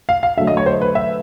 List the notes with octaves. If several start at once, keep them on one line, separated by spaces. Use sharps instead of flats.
F5
F5
D3 F#3 A3 E5
D#5
C#5
C5
B4
E5